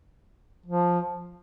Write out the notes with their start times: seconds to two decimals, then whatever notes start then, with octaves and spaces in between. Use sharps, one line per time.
0.66 F3